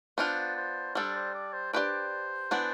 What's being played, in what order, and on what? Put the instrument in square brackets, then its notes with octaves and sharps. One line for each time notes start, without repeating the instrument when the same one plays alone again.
[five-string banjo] B3 D4 F4 [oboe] C5
[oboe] C5
[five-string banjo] G3 D4 A4 [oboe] C5
[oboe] C5
D5
C5
[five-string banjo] D4 G4 B4 D5 [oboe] C5
[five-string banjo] E3 B3 D4